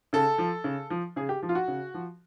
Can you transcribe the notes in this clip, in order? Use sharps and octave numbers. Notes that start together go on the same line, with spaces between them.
C#3 A4
F3
C#3
F3
C#3 G#4
G4
F3
F4
F#4
C#3
F3